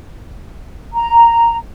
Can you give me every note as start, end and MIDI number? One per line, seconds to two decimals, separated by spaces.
0.93 1.56 82